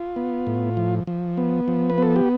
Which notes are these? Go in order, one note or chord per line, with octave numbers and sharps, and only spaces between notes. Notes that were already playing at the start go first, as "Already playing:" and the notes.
Already playing: F4
B3
A2
F3
F3
B3
F3
B4
B3 A4
G4